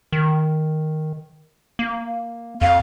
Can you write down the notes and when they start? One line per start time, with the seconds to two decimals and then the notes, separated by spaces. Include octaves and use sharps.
0.12 D#3
1.79 A#3
2.61 F2 F5